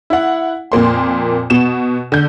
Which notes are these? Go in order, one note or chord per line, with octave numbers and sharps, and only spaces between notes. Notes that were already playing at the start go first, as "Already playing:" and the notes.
E4 F#5
F2 A#2 A#3 C6
B2 B3 E7
D3 G6